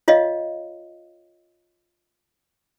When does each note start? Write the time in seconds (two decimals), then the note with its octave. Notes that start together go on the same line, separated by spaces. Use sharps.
0.08 F4 C#5 D#5 F5